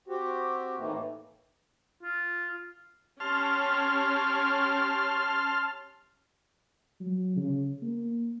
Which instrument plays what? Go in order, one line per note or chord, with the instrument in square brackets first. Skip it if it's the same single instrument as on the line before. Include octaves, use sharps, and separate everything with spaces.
[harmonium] C4 F#4 G4
A2 D#3 E3 A3 A#3
[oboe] F4
[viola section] C#4 G4 [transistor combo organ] A5 C6 F6
[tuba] F#3
C#3
A#3